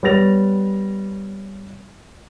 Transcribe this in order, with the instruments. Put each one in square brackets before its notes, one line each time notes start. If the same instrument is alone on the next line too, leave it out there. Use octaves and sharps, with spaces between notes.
[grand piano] G3 B3 C#5 A6 A#6 F7